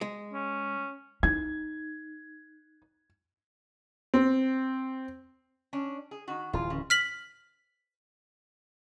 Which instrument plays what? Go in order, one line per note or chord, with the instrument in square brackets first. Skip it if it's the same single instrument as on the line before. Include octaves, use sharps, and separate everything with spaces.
[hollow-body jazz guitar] G#3
[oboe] C#4
[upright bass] D#4 [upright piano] G#6
[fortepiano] C4
[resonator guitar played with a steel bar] C#4 D4
G#4
D#3 F#4
[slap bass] D1 E3 [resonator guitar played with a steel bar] F4
[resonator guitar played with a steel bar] C#3
[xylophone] F6 B6 F#7